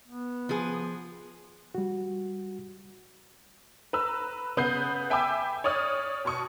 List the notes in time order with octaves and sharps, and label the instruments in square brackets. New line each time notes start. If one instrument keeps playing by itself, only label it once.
[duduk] B3
[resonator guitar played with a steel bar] F3 G#4
[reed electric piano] G3 F#4
[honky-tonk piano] B4 A#5 E6
C#3 B3 D#6 G6 C7
E5 G5 G#5 B5 D6 E6
C#5 D5 D#6 F6
B2 A5 C#6 D#6